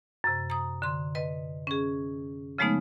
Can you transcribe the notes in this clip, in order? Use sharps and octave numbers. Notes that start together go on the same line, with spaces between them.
F#2 C3
A#5 D#6
D3 C6
B4 D#5
C#4 G#4
C#3 F3 G#3 A3 B3 D#4